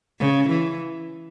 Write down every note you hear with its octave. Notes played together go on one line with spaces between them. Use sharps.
C#3
E3